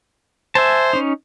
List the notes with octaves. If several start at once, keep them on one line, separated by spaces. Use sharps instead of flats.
C5 E5 G#5 A5
C#4 D#4